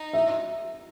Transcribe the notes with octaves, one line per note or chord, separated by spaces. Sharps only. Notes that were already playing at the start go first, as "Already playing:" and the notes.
Already playing: D#4
E5